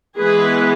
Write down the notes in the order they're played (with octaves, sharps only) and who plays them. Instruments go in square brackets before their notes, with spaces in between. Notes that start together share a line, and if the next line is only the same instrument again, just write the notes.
[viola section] E3 G#3 B3 G#4 B4